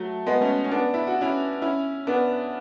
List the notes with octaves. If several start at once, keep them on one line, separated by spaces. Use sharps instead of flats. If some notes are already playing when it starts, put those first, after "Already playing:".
Already playing: F#3 A3
G#3 B3
A3 C#4
C#4
B3 D4
E4
F#4
C#4 E4
C#4 E4
B3 D4